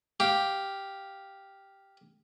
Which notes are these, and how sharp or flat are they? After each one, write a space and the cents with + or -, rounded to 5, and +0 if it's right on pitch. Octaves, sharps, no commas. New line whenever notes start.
G4 +0 F5 +0